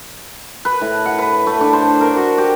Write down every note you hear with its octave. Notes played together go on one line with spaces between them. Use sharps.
B4
A2
F#5
B4
A3
D4
C5
A#4
F#4
G4